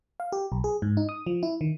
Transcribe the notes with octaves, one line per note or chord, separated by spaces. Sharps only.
F5
G4
B1
G#4
G#2
D#4
D#6
F3
E4
D#3